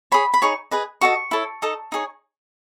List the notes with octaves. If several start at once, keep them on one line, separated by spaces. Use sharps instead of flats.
G#4 C#5 B5
B5
D#4 G#4 C#5 C#6
G#4 B4 D#5
F#4 A4 D#5 C#6
E4 A4 C#5
D#4 A4 D#5
D#4 G#4 C#5